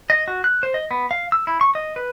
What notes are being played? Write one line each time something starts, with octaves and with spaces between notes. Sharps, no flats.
D#5
F#4
F#6
C5
D#5
B3
F5
E6
E4
C#6
D#5
B4